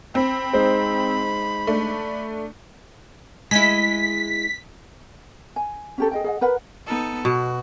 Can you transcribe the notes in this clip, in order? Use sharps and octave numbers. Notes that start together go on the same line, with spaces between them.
C4 B5
G#3 D#4 C5
A3 D4
G#3 E4 B6
G#5
C#4 G4 A4
G#4 D#5 G5
G#4 D#5 F#5
A#4 B4 F#5 B5
B3 D#4 A4
B2 F#4